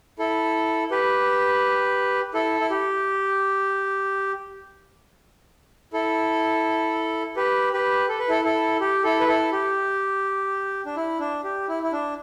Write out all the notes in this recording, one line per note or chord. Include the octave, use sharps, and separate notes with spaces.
E4 A4
G4 B4
E4 A4
E4
G4
E4 A4
G4 B4
G4 B4
A4
B4
E4 A4
E4 A4
G4
E4 A4
B4
E4 A4
G4
D4
E4
D4
G4
E4
E4
D4